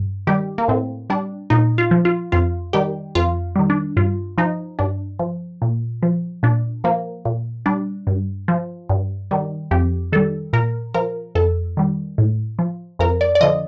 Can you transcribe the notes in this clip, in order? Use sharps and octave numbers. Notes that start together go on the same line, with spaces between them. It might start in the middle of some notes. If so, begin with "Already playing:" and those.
Already playing: G2
D#3 G3 G4
A#3
A2 C4
G3 D4
A#2 D#4
F4
F3
F4
F2 F4
D#3 G3 G4
F2 F4
D#3 G3
D4
G2 F4
F3 D#4
G2 D4
F3
A#2
F3
A#2 D4
F3 A#3
A#2
G3 D4
G2
F3
G2
D#3 G3
F2 G4
D#3 G3 A4
A#2 A#4
F3 A#4
F2 A4
D#3 G3
A2
F3
F2 A#4
D5
D5
D3 F3 D#5